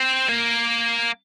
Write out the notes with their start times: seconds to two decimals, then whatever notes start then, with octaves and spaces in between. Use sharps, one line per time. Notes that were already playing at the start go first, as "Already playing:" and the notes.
Already playing: C4
0.29 A#3